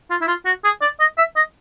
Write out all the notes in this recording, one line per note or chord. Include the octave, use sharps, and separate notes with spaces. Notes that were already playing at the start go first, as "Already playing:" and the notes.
F4
E4
F4
F#4
G#4
D5
D#5
E5
D#5